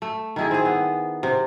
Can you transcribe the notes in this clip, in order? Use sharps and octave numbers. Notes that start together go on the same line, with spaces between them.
A3
D#3 E4 G#4
C4 G#4
B3
C3